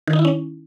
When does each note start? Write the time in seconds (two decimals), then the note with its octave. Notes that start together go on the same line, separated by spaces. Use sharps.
0.07 D#3
0.13 D#4
0.19 E4
0.25 C#4